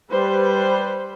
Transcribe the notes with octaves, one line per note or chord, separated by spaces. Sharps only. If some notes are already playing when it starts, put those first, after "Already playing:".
G3 B4 C5